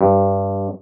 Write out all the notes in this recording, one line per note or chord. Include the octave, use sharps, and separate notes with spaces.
G2